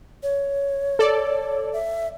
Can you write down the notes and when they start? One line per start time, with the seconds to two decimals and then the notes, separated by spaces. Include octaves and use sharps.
0.23 C#5
0.99 A4 D5
1.73 E5